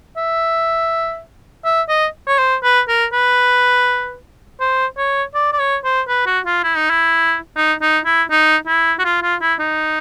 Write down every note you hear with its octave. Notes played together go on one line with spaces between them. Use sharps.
E5
E5
D#5
C#5
C5
B4
A#4
B4
C5
C#5
D5
D5
C#5
C5
B4
F#4
F4
E4
D#4
E4
D#4
D#4
E4
D#4
E4
F#4
F4
F4
E4
D#4